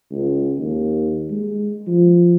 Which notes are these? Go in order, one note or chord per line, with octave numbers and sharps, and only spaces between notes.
C#2
D#2
G#3
F3